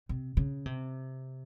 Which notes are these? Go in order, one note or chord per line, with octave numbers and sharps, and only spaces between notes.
C3
C#3
C3